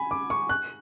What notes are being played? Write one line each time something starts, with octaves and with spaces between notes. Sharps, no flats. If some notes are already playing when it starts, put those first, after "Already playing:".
Already playing: G#5 B5
D6
C#6
F#6